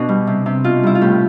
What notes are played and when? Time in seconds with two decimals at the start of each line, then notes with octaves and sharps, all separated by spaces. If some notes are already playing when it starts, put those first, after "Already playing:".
Already playing: B2 D4
0.09 G3
0.27 C3
0.46 C3
0.64 B2 F4
0.83 G3 E4
0.95 F4
1.01 A2 G4